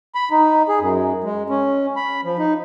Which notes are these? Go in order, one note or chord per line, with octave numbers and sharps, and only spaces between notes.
B5
D#4
G#4
F#2
G#3
C#4
B5
F3
D#4